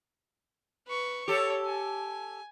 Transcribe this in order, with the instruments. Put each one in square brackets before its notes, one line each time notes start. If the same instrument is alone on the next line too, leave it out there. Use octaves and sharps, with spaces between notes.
[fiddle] B4 C#6
[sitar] G4 A4 [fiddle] C#5
[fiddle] G#5